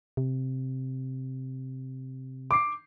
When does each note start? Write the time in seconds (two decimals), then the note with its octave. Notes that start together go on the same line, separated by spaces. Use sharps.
0.17 C3
2.51 D6 C7